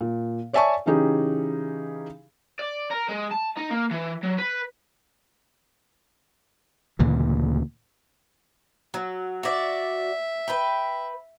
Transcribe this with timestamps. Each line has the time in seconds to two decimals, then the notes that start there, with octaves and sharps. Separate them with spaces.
0.01 A#2
0.53 C#5 D5 E5 G#5 A5 C#6
0.86 C#3 E3 C#4 D#4 G4 G#4
2.59 D5
2.91 A#4
3.08 G#3
3.31 A5
3.57 D#4
3.70 A#3
3.91 E3
4.23 F#3
4.39 B4
6.99 D2 A#2 C#3 E3
8.94 F#3
9.43 F#4 D5 E5
10.48 B4 G5